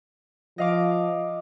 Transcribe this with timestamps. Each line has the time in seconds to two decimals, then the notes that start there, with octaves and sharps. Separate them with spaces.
0.58 F3 D#5 F5 D6